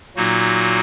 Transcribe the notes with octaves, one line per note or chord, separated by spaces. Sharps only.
A#2 F#3 A#3 D#4 F#4